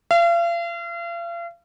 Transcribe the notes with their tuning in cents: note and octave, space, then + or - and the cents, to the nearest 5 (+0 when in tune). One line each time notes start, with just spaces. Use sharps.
F5 -40